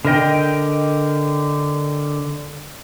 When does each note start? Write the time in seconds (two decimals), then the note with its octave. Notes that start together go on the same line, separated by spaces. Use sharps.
0.05 D3 A#4 D#5 G5